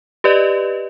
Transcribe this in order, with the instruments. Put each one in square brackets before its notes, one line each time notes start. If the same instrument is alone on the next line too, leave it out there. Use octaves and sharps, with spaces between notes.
[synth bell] G4 B4 D5 D#5